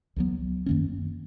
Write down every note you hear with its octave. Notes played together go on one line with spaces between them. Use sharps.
C#2 C#3 F#3 B3
F#2 D#3 A#3 C#4